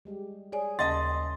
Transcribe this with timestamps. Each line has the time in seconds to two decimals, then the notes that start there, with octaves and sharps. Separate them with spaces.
0.05 G3 G#3 G4
0.52 G#4 C#5 D5 G#5
0.79 D#2 C#3 A#3 D#5 E5 A5 C6 A6